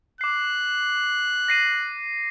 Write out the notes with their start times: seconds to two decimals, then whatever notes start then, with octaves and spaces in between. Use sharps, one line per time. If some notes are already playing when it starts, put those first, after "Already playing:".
0.21 D6 F#6 C7
1.48 A#6 C7 D#7